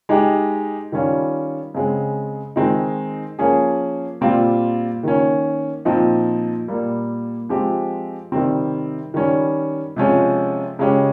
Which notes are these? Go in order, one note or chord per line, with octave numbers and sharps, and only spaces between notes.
G#3 D#4 G4
D#3 G3 C#4 F4
C#3 G#3 C4
D#3 G#3 C4 D#4
F3 A#3 C#4 G#4
A#2 G3 C4 F4
D#3 A#3 C#4
A#2 F3 C4 D#4
A#2 G3 A#3
F3 G#3 C4 G4
C3 D#3 G3 C4
D#3 G3 C#4
C3 F3 G#3 C#4
C#3 G#3 C#4 G4